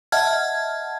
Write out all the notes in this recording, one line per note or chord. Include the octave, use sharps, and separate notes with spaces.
D#5 E5 F#5 A5 F6 G#6